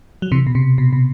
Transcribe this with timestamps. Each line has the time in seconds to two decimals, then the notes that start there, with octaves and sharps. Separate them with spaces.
0.22 F#3
0.31 C3 E3
0.47 B2
0.55 C3
0.78 B2
0.93 B2